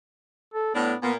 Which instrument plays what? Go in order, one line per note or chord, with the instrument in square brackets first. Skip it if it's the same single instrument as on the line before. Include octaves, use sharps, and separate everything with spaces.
[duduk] A4
[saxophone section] A2 D4 [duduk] B3
[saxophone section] A#2 A#3 [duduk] B3